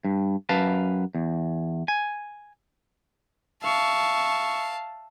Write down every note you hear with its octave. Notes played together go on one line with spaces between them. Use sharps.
G2
F#2 B4 F5 A5
E2
G#5
E5 F5 A5 C#6